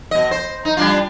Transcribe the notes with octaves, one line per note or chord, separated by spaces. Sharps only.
B2 D#5
C5
D#4
G3 D4 F4